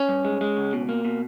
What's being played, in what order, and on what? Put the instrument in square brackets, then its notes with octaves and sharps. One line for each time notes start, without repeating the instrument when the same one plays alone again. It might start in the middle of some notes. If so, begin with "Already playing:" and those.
Already playing: [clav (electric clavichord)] C#4
[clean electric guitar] G2
G#3
G#3
C#2
B2
A#3
B2